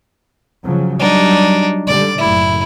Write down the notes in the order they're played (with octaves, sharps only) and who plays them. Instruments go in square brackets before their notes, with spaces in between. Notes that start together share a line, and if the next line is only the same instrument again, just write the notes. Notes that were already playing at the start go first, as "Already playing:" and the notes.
[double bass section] C#3 F3 F#3
[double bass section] F#3 G3 [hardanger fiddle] D4 D#4
[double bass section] D3 G3 [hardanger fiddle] D5
[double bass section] F#1 A2 [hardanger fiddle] E4